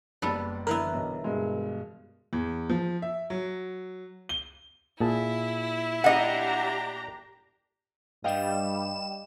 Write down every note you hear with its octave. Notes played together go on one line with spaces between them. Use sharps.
F#1 G3 B3 A4 D5
D3 E3 B3 A#4 E5
B1
G2 B2 G#3
E2
F3
E5
F#3
G7
A#2 E4 G#4 A5
D4 G4 D#5 F#5 A#5
G2 G3 D#5 F5 G5 E7